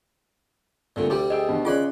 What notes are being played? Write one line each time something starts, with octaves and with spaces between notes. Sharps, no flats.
C2 A#2 D3 A3 C4
D2 G3 G4 D5 D6
G#4 D#5 G5 E6
B2 D3 D#3
C#3 C#4 F4 G#4 B4 D5 C6 D6